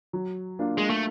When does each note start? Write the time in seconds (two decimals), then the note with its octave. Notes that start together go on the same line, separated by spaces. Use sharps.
0.13 F#3
0.59 A#3 D4 F4
0.78 G#3
0.90 A3